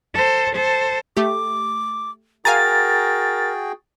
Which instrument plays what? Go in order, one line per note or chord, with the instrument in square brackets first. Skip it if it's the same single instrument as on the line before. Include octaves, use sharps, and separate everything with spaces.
[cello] A4 C5
A4 C5
[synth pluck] A3 G4 [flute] D6
[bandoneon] F#4 G#4 G5 [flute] A#4 [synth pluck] F5 G#5 A#5 [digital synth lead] A6